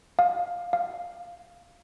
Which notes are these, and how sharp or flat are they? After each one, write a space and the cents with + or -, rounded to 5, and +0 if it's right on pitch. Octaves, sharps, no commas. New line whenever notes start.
F5 +10
F5 -5